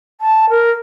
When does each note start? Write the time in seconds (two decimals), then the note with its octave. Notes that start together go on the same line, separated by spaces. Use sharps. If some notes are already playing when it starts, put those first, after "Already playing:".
0.21 A5
0.50 A#4